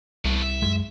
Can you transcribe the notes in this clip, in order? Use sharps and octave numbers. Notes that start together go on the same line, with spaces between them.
C2 A3 B3
E5
F#2 G#3